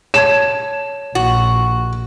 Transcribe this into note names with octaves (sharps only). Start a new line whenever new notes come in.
C#5 A5 G#6 E7
A#1 F#4